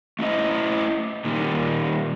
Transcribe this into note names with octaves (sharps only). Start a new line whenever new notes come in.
A3 C#4 E4 D#5
A#2 D#3 G3